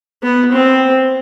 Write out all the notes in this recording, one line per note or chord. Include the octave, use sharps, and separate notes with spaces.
B3
C4